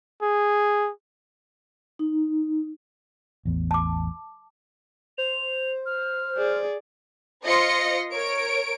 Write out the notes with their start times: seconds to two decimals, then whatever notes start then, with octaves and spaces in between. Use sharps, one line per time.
0.22 G#4
1.99 D#4
3.45 A1 E2 B3
3.71 A5 D6
5.18 C5 F7
5.86 F6
6.38 G#4 D5
7.46 F4 C5 D#5 C6 A#6 C#7
8.12 A#4 C#5 D7